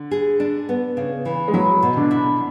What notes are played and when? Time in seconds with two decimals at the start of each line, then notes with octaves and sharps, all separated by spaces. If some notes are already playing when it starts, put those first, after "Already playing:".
Already playing: D3
0.11 G#4
0.40 D4
0.69 B3
0.97 C#3
1.25 E3
1.48 G#3
1.54 F#3 E4
1.82 B2
1.96 D3 D4
2.11 E4